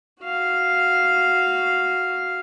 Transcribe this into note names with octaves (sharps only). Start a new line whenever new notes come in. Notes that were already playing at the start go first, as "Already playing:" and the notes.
F#4 F5